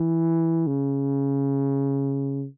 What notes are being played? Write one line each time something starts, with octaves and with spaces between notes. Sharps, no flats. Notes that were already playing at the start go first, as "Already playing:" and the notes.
Already playing: E3
C#3